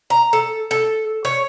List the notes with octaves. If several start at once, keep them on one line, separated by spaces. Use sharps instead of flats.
A#5
A4
A4
C#5